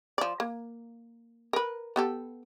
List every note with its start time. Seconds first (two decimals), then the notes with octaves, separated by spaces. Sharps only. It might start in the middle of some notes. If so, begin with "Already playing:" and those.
0.18 F3 D5
0.40 A#3
1.53 A#4 B4
1.96 B3 G4 A4